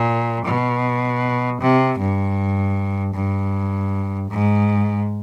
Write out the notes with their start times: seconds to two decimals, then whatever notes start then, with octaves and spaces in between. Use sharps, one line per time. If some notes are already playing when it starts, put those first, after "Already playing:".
Already playing: A#2
0.45 B2
1.61 C3
1.99 G2
3.14 G2
4.30 G#2